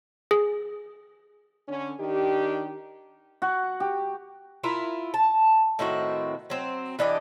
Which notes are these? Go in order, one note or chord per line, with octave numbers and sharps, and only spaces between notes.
G#4
D3 C#4
D#3 D4 G4
F#4
G4
E4 F4 A#4
A5
A2 D#3 C4 F#4
F#3 C4
E3 D4 G4 D#5